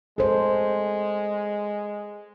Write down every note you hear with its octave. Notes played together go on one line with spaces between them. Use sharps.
G#3 A4 C5